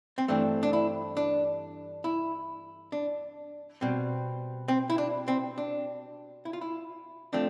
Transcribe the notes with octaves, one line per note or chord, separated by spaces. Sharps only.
C4
G2 E3 A3 C4 D4
D4
E4
D4
E4
D4
B2 G3 C4
C4
E4
D4
C4
D4
E4
F4
E4
F3 A3 C4 D4